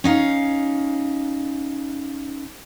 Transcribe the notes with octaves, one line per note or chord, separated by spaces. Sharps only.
C#4 D#4 F5